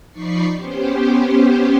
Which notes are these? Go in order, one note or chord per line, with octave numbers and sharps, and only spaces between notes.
F3 D#4 D5 B5 C#6 C7
B3 C#4 G4 C5